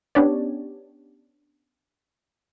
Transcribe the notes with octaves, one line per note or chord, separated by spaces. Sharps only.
B3 C#4 D4 G4 C#5 D5